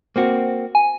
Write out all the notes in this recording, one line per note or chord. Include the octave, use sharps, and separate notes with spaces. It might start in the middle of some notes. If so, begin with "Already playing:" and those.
A#3 C4 F#4
G#5